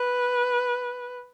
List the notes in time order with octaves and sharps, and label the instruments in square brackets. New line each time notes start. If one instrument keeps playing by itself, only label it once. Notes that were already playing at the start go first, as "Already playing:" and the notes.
Already playing: [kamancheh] B4